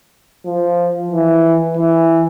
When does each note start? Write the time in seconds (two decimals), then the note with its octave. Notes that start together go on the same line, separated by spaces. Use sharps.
0.45 F3
1.12 E3
1.77 E3